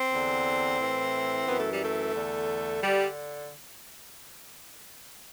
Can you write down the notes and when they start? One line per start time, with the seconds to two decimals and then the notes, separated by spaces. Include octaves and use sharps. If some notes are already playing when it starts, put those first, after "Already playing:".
Already playing: C4
0.12 E2 D3
0.79 A2 E3
1.47 F#2 E3 B3
1.59 A3
1.73 G3
1.85 A3
2.15 E2 D3
2.83 D3 G3